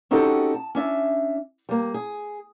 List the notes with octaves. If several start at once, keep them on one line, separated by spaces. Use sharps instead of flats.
C4 C#4 D#4 F#4 G4 A4
A5
C#4 D4 E5
G3 A#3
G#4